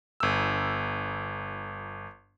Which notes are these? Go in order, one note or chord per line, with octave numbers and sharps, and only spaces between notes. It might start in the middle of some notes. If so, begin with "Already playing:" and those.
G1 E6